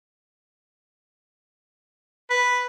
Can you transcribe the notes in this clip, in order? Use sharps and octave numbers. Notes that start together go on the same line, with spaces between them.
B4